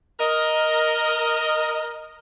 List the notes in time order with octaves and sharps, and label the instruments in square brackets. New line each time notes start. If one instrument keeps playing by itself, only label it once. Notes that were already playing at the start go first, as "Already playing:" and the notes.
[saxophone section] A#4 D#5